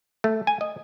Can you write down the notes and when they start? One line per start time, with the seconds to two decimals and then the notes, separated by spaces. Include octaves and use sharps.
0.24 A3
0.47 G#5
0.61 D#5